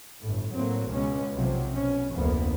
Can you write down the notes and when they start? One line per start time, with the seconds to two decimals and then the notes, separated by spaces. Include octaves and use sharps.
0.23 G1 A2
0.55 A2 F#3 A#3 C4
0.91 C#2 B2 G#3 C#4
1.36 B1 C3 F3 F#3
1.77 B2 C#4
2.14 F1 D2 F3 A#3 B3